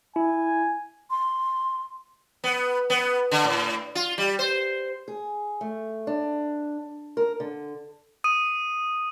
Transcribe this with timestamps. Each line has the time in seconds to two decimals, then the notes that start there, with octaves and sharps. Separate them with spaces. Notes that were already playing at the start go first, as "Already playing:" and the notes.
0.16 E4 G#5
1.10 C6
2.44 B3
2.90 B3
3.31 D3
3.44 A2
3.95 F4
4.18 G3
4.39 C5
5.08 G#4
5.61 A3
6.07 D4
7.17 A#4
7.40 D3
8.24 D#6 D#7